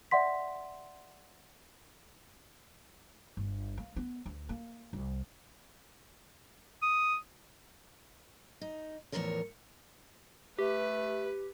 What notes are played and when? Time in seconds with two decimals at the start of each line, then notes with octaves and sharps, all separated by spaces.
0.11 D5 E5 F#5 C6 B6
3.37 G1
3.78 A#3
3.96 B3
4.26 D2
4.49 A#3
4.93 C2
6.82 D#6
8.61 D#4
9.12 E2 A2 C#3 F3 A#4 C#5
10.59 A3 G4 B4